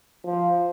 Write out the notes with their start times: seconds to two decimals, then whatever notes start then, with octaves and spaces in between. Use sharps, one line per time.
0.24 F3